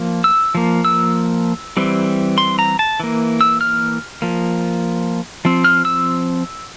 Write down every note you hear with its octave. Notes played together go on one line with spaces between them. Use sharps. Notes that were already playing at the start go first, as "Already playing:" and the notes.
Already playing: F3 A#3
E6
F3 A#3
E6
E3 G3 C4
C6
A#5
A5
E3 A#3
E6
F6
F3 A#3
F3 C4
F6
E6